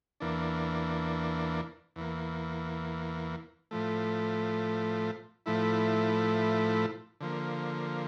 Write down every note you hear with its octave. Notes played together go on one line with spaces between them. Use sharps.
E2 E3 A#3 D4
E2 E3 A#3
A2 F3 A3
A2 F3 A3 E4
D3 F3 A#3